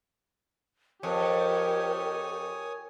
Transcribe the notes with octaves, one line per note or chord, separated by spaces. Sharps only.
F2 G4 A#4 C#5 G#5 D#6